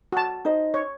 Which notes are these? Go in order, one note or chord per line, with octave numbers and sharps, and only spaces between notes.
F#4 A5
D#4 C5 D#5
C#5